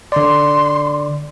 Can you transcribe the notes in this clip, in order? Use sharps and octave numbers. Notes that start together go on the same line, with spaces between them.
D3 D5 C6